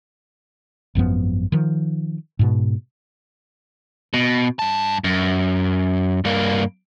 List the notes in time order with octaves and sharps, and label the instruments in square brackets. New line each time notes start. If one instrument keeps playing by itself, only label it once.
[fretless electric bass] G#1 F#2 F3 B3
D#3 F3
G#2 B2
[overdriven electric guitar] B2
G2 A5
F#2
G2 A#3